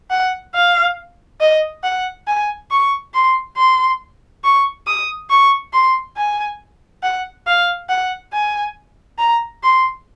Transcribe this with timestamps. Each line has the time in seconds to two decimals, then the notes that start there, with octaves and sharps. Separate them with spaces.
0.10 F#5
0.54 F5
1.40 D#5
1.83 F#5
2.27 G#5
2.71 C#6
3.14 C6
3.57 C6
4.44 C#6
4.87 D#6
5.30 C#6
5.73 C6
6.17 G#5
7.03 F#5
7.47 F5
7.89 F#5
8.33 G#5
9.19 A#5
9.63 C6